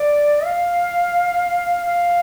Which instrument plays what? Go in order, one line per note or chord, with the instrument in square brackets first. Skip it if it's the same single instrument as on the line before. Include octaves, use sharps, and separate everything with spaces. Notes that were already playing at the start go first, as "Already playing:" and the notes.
Already playing: [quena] D5
F5
F5